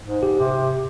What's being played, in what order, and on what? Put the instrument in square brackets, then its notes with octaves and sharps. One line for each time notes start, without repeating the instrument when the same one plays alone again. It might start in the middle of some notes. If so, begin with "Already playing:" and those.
[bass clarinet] G#2
[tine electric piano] G4
[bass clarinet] C3